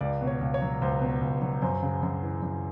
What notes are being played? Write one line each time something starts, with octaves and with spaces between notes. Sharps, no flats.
C#2 D5
B2
C#5
C#2
C#5
F#3
C#2 C5
B2
C#2
F#3
F#2 C5
C#3
F#2
E3
F#2